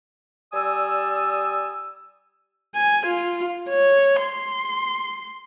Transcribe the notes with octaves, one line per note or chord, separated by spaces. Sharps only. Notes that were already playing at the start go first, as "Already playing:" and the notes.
G3 D5 G#5 D#6 E6
G#5
F4
C#5
C6